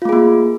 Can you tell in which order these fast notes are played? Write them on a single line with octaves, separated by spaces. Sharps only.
F4 A3 G#4 A#3